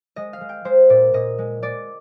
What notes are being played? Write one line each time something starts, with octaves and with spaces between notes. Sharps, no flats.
G#3 D#5
F5
G#3
G5
G#3 C5
A#2 D5
A#2 D#5
G#3
G#3 D5